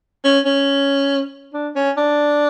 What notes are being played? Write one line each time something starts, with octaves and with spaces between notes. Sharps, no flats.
C#4
C#4
D4
C#4
D4